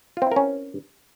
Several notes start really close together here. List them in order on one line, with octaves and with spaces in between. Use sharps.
F4 C4 E4 A#4 C#4